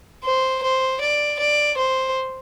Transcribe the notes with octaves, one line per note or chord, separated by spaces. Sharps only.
C5
C5
D5
D5
C5